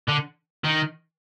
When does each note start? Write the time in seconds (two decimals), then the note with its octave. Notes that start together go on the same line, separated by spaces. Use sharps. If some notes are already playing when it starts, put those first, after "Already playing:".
0.08 D3
0.64 D#3